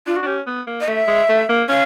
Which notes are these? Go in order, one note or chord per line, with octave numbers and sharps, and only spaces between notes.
D4 F4
F#4
D4
C#4 G4
B3
A#3
D#5
A3 E5
G#3
A3
A#3
C#4 F5